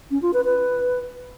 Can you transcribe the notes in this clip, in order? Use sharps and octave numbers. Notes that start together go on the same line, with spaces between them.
C#4
F4
B4
B4